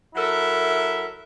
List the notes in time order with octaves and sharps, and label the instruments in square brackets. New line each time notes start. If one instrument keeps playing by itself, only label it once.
[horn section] F#3 E4 A4 A#4 E5